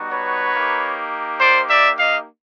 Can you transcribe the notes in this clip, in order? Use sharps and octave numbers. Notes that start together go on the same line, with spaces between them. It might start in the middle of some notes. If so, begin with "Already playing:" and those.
Already playing: G3 B3 D#4 F#4
B4 C#5
A#3 D#4 G4
C5 D5
D5 E5
D#5 F5